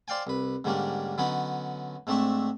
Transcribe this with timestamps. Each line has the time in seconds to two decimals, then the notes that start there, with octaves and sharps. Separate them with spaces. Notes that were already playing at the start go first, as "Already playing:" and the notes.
0.08 C5 D5 F5 G5 G#5
0.27 C2 B4
0.64 G#2 D3 G3 A#3 C#4 D4
1.18 D3 F#3 B3 C#4 D#4 B4
2.07 G#2 A3 C4 D4 E5 C#6